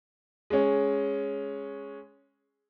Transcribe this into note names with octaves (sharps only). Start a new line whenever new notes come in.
G#3 C#4